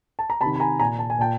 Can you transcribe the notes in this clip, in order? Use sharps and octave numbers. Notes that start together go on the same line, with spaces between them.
A5
A#5
C3 A5 B5
D#3
B5
G#5 A#5
A#2 G#5 A#5
A5
G#5
A#2 G5 A5